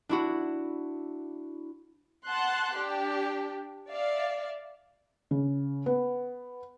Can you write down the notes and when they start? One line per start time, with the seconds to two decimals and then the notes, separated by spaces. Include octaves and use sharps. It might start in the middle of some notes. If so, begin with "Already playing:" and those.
0.09 D4 E4 F#4
2.27 F#5 A5 C6 F#6
2.75 D4 G4
3.89 D5 E5 F5
5.31 C#3
5.86 B3